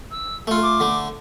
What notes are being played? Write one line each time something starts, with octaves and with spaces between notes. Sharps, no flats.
E6
A3 F4 A4
D6
D3 A3